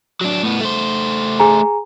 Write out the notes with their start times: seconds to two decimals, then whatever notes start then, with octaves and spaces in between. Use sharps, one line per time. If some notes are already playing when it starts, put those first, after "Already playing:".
0.21 F#3 D4
0.43 A2 B3
0.60 A3 C5
1.40 G#4 G#5 A#5